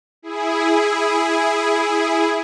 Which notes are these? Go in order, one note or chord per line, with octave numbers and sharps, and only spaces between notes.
E4 G#4